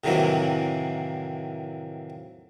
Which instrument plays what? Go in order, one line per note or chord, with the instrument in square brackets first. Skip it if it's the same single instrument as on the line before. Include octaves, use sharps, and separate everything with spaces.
[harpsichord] A2 C3 D#3 E3 F#3 A#3